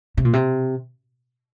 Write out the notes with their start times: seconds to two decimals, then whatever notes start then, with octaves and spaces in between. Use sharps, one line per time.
0.17 C3
0.25 A#2
0.33 C3